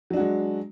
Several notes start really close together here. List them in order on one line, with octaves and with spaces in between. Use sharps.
F#3 D4 F#4 G#3